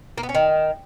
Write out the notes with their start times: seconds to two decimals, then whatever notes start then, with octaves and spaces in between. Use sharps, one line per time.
0.18 A#3
0.23 B3
0.29 C#4
0.35 D#3